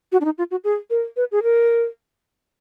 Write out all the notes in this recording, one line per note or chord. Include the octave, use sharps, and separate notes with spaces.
F#4
D4
D#4
F4
F#4
G#4
A#4
B4
G#4
A#4